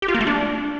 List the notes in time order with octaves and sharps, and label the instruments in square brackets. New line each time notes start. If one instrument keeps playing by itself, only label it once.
[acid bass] G4
F4
A#3
A3
D4